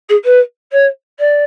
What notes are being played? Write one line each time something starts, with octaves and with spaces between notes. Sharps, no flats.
G#4
B4
C#5
D5